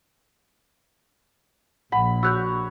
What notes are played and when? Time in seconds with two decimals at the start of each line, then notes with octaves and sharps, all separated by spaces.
1.92 A#1 F#5 B5
2.23 F#4 C#5 E6 F#6 G6